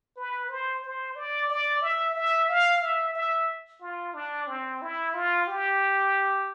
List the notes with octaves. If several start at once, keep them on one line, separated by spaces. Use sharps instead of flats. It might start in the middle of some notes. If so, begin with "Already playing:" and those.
B4
C5
C5
D5
D5
E5
E5
F5
E5
E5
F4
D4
C4
E4
F4
G4